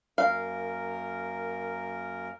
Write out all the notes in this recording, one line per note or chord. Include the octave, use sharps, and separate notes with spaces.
F#2 A#3 A#4 F5